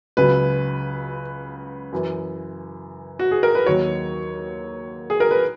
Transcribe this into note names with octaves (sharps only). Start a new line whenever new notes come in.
C#2 C#3 F#3 B4
F#2 E3
F#4
G#4
A#4
B4
D#2 D#3 F#3 C#5
G#4
A#4
B4